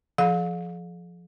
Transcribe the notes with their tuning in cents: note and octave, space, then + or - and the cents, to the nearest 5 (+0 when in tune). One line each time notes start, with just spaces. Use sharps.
F3 +0 G#4 +45 F5 +35